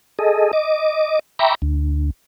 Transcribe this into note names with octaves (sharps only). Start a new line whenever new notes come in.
G#4 A4 D#5
D#5 D6
E5 G5 A#5 B5 C#6 D6
D2